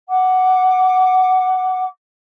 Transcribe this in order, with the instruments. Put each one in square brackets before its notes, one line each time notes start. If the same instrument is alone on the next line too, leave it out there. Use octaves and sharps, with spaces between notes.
[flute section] F#5 D6